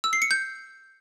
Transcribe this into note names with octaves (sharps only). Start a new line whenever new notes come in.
E6
C7
C#7
G6